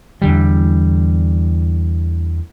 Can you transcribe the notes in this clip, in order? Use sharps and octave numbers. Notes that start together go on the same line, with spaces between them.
E2 D3 G3